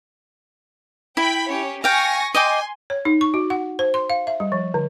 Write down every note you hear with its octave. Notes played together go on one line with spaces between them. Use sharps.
E4 G5 B5
C#4 G4 C#5
F5 G5 G#5 C#6 A#6
D#5 G5 G#5 C6 D6
C#5
D#4
C#6
F#4
F#5
C5
C6
F5
E5
G3
F3
D3